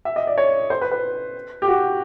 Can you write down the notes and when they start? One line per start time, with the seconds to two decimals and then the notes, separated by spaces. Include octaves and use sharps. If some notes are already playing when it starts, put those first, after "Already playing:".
0.05 E5
0.16 D#5
0.27 D5
0.38 C#5
0.70 C5
0.81 B4
0.91 B4
1.62 G4
1.68 F#4